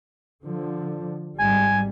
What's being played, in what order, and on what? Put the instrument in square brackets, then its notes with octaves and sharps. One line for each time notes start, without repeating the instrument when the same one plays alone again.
[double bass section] D3 F3
[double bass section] G#1 G#2 G3 [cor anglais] G#5